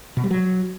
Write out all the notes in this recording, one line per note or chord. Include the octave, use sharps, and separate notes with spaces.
B2
G3
F#3